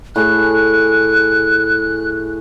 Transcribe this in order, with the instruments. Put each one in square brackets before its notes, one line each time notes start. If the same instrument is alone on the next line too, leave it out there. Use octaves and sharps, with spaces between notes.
[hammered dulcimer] A2 G#4 [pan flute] F#6